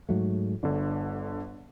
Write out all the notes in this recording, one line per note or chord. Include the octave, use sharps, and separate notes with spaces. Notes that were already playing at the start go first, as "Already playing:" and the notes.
G#2 F#3 A3
G1 D3 D4